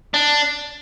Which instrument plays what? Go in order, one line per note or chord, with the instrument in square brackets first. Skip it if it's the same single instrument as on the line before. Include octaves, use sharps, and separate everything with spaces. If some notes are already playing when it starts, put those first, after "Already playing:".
[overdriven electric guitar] D4